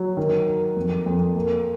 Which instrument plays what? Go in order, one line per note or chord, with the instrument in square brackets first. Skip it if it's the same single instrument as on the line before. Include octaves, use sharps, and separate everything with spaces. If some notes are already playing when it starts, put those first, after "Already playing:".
Already playing: [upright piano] F#3
D#3
A#4
F2
F2
A#3